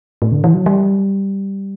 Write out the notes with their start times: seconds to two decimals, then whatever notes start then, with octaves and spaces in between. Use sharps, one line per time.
0.22 A2
0.32 D3
0.44 E3
0.54 F#3
0.66 G3